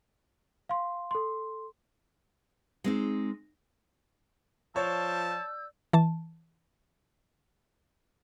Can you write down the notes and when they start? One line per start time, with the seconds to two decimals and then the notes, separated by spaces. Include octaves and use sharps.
0.69 F5 C6
1.11 A4 C6
2.84 G#3 C4 D#4
4.76 F3 C#5 D5 A5 E6 G6
5.93 E3 A5